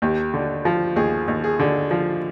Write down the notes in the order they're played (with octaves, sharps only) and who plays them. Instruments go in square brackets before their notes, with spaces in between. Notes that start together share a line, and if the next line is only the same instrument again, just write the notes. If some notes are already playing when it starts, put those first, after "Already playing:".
[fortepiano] D#2 [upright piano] G4
[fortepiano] D3
F3
[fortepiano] D#2 [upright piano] G#4
[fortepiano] D#2
[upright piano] G#4
[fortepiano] D3
F3